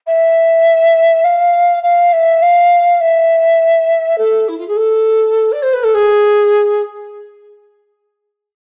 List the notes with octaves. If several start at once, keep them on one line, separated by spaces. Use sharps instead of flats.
E5
F5
F5
E5
F5
E5
A4
E4
F4
G#4
A4
D5
C5
B4
A4
G#4